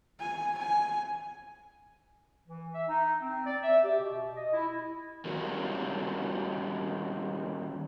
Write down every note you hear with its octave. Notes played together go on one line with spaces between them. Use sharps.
G#5
G#5
E3
E5
D#4
C4
D5
E5
G4
B2
D#5
E4
D#3 G3 C#4 F#4